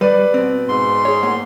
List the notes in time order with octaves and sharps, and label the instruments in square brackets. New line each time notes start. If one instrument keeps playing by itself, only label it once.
[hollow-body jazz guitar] G3 [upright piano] B4 D5
[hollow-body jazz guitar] B2 C4
[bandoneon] G#2 C6
[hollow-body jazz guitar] G#4 C#5
A2 A#3 F#5